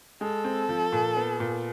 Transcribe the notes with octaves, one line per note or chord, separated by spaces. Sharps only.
G#3 A4
C4
F3
A#2
B3
A#2